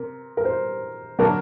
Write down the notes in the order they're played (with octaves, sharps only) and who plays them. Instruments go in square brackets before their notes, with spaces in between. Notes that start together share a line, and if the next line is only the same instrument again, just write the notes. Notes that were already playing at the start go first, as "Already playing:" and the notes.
Already playing: [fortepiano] C3 [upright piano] A#4
[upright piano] A#4
C5
[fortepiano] D3 F#3 A#3 D4 [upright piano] A#4